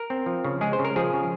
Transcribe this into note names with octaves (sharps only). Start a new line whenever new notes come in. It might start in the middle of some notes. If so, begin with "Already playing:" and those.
Already playing: A#4
C4
F3
C#3
G#3 G#4
C5
C#3
A#4
F3 G#4
C#3